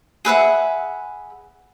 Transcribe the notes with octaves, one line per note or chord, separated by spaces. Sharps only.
G#4 B4 E5 F#5